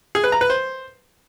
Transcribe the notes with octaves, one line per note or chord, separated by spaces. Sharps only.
G#4
B4
A#5
B4
C5